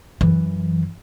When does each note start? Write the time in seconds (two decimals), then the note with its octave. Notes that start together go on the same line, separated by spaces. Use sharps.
0.21 F#2 E3